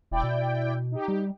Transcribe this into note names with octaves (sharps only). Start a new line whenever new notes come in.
E1 E4 D5 G5
B2
D#4 G4
G3